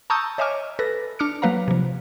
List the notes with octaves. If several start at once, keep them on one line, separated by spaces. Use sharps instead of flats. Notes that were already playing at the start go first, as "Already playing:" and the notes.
A5 A#5 C#6 D#6 E6 G6
C#5 D#5 E5 G#5 D6 F6
A4 B4 A#6
D4 D6 F6 C#7
F#3 A#3 B4 F5 A#5
C3 F3